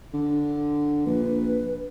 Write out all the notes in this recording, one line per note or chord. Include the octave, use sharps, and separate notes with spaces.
D3
A#1 B4